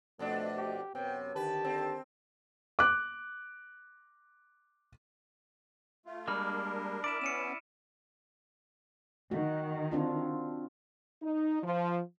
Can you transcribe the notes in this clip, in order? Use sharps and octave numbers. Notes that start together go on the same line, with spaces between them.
F2 B2 A3 D4
G4
F#2 C3 B3 C#5 G5
D3 D#3 G4 B4 A5
C4
D6 F#6
A3 F4
G3 G#3 A#3 D4 A#4 B5 F6
E4 D5 D7 E7
B3 C#4 C#7 D#7 E7
D#3 F#4
C4 D4 F4
D#4
F3